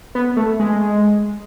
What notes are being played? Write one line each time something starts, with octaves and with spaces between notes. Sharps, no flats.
B3
A3
G#3